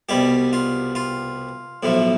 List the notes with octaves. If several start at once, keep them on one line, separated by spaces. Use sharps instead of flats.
C2 B2 G3 G4
F4
F4
B1 A2 F3